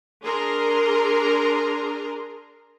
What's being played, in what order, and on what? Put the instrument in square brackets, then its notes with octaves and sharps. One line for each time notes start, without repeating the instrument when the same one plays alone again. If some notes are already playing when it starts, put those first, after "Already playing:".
[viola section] D4 G#4 A#4 A#5 C6